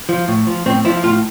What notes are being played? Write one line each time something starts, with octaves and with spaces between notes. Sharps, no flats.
F3
A2
F3
A2 C4
F3 E4
A2 F4